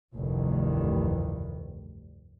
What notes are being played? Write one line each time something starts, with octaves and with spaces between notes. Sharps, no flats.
F1 D2 G2 D#3 E3